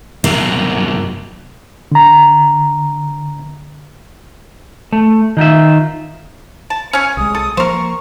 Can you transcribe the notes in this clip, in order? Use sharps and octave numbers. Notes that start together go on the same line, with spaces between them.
C2 F#2 A#3
D3 A#5
A3
D#3 D#4 F4 E5
A5
C#4 C#5 G#5
C2 G#3 D#6
A4
F3 A3 A#3 A#4 C5 C#6